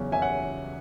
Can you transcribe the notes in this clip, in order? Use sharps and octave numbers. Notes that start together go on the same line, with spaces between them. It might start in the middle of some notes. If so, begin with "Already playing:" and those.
Already playing: E2 C#3 F#3 C#4
F#1 E5 G#5
F#5